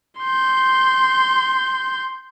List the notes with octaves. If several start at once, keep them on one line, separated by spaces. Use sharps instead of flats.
C6 G6